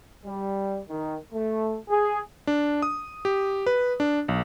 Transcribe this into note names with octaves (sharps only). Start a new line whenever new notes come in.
G3
D#3
A3
G#4
D4
D#6
G4
B4
D4
B1